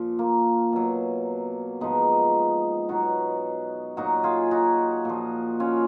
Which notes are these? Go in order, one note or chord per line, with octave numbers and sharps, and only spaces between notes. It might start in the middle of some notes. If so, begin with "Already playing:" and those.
Already playing: A#2 F3
A#3
B2 F#3
G#2 F3 B3 D#4
B2 F#3 D#4 F#4
A#2 F#3 D#4 F#4
F4 G#4
D#4 F#4
A#2 F3
C#4 F4